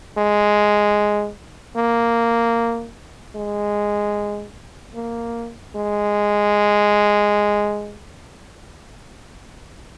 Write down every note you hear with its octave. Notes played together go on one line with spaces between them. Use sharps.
G#3
A#3
G#3
A#3
G#3